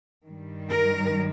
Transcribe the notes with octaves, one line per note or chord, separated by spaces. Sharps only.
G2 D#3 G3
A#4